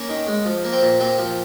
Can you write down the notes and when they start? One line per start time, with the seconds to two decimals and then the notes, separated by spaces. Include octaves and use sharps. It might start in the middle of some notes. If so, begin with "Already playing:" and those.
Already playing: A#3 C#4
0.09 D#3
0.27 G#3
0.45 F3
0.64 A#3
0.72 C4
0.82 A#2
1.00 A#2 C4
1.18 F3